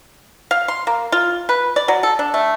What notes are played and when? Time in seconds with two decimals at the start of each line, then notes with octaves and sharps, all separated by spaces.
0.51 F5
0.68 C6
0.87 A#3
1.12 F4
1.49 B4
1.76 D5
1.88 F#3
2.03 A4
2.19 D4
2.34 A3